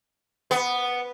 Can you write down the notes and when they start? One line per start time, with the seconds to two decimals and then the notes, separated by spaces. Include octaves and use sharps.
0.51 B3